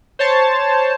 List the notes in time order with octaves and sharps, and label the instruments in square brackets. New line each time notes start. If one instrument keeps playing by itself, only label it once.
[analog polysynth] C5 C#5 A5